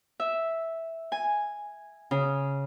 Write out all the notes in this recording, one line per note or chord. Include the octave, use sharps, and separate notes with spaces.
E5
G#5
C#3